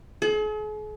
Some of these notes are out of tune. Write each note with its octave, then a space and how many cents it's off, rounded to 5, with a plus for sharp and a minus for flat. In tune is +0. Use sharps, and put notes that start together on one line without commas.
G#4 +45